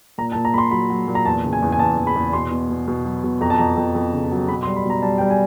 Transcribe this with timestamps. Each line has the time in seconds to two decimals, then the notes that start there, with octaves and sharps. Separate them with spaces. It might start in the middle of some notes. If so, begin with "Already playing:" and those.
0.18 A#2 A#5
0.32 A5
0.35 A#2
0.45 A#5
0.54 A#2 B5 C6
0.71 F#3 B5
0.90 F#3
1.08 A#2
1.15 A#5
1.25 E2 A5
1.44 C#3
1.53 G#5
1.62 E2
1.72 G#5
1.79 E2 A5
1.97 E2
2.07 B5
2.16 E2
2.33 B2 C6
2.52 B2
2.70 B2
2.88 B2
3.05 F#3
3.24 B2
3.41 F2 A#5
3.50 A5
3.58 F2 A#5
3.77 F2
3.95 F2
4.13 C#3
4.32 F#3
4.48 B2 B5
4.63 C6
4.67 G3
4.76 B5
4.85 B2 A#5
5.02 G3 A5
5.18 G3 G5
5.30 G#5